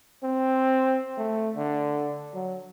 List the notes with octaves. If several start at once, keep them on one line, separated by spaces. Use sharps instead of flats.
C4
A3
D3
F#3